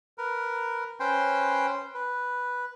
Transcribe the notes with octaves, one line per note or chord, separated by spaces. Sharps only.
A#4 B4
C#4 B4 C5 G5 C6
B4